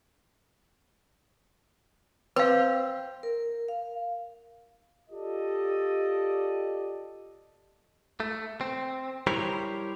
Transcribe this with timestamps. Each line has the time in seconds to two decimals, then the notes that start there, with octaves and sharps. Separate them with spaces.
2.36 C4 B4 F5
3.23 A#4
3.68 F5
5.10 F4 G4 A4 D5 D#5
8.20 A3
8.61 C4
9.27 G3 E4 G4 A#4 C5 C#5